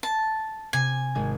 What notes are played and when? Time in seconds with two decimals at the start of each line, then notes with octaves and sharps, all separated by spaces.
0.03 A5
0.73 C3 G#5
1.15 G#1 G#3 G#6